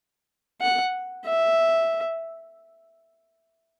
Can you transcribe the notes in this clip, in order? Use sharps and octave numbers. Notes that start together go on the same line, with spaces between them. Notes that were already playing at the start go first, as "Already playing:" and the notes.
F#5
E5